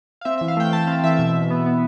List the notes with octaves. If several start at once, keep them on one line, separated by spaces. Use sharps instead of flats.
F5
C4 E5
E3 E5
F5
A3 G5
E3 A5
C4 F5
E3 E5
B2 E5
B2
B3
B3